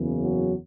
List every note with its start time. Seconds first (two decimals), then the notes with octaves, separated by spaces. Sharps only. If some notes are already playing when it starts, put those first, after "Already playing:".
Already playing: F#1 E2 C#3
0.23 F#3